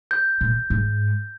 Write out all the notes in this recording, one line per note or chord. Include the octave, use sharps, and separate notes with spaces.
G6
A#2
G#2